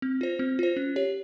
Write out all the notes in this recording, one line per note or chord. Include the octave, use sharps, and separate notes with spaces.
C4
F4 C5
C4
F4 C5
C#4
G4 C#5